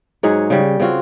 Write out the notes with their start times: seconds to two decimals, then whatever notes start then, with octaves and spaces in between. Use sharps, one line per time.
0.23 G#2 F#3 G#4 F#5
0.50 C#3 G3
0.80 C#3 C4 F4 F#4